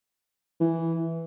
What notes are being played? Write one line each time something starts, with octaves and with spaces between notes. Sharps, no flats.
E3